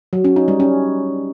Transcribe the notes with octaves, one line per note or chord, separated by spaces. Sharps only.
F#3
C#4
D#4
G3
C#4